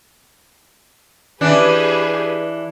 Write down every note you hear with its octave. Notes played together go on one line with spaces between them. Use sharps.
E3 D4 G4 G#4 B4